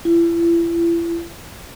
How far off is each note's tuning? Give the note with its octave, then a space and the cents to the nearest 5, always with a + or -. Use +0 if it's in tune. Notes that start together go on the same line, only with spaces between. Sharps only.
E4 +40